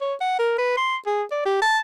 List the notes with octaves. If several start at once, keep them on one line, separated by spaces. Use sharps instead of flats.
C#5
F#5
A#4
B4
C6
G#4
D5
G4
A5